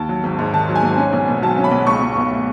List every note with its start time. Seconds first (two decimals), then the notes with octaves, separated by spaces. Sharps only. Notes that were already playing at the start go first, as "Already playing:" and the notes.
Already playing: D#2 A5
0.09 F#3
0.24 G#1
0.39 G#2
0.53 D#3 A5
0.69 F#3
0.76 G#5
0.83 G#1
0.97 C#4
1.13 B1
1.28 B2
1.42 F#3 A5
1.58 C#4
1.64 B5
1.71 B1
1.87 C#2 C#6
2.02 C#2
2.16 B2
2.31 A3